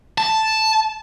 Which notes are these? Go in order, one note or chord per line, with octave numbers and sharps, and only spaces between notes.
A5